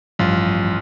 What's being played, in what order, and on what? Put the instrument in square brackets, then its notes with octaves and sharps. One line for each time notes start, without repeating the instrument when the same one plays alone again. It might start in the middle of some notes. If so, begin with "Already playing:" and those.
[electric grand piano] A1 F4 [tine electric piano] G2 F3 G3